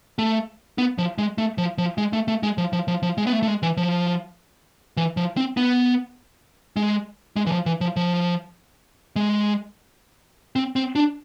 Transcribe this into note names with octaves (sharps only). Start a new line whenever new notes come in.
A3
B3
F3
G#3
A3
F3
F3
G#3
A3
A3
G#3
F3
F3
F3
F3
G#3
B3
A3
A3
G#3
E3
F3
E3
F3
C4
B3
G#3
G#3
E3
F3
E3
F3
F3
G#3
C4
C4
D4